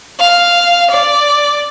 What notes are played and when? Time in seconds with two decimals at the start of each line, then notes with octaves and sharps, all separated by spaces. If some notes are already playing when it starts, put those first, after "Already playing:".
0.20 F5
0.91 D5